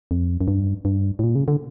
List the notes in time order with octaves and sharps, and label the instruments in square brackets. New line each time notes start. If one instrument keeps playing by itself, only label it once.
[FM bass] F2
F#2
G2
G2
A2
A#2
C#3
D3